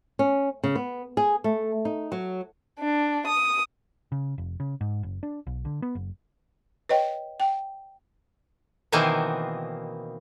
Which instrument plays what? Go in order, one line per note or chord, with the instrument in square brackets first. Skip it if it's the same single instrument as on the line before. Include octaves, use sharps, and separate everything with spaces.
[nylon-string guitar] C#4
C#3
B3
G#4
A3
D#4
F#3
[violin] D4
D#6
[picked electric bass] C#3
F1
C#3
G#2
F#1
D4
B1
D3
B3
F#1
[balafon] B4 C#5 D#5 G5
G5
[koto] B2 D#3 E3 A#3 C4